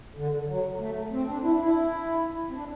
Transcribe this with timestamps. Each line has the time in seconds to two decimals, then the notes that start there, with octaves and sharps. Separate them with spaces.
0.16 D3
0.48 F#3
0.80 A3
1.11 C4
1.27 D4
1.43 E4
1.52 D4
1.60 E4
2.49 C4
2.53 D4